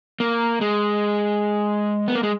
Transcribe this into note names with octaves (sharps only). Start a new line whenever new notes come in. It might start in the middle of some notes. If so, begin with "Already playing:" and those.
A#3
G#3
B3
A#3
G#3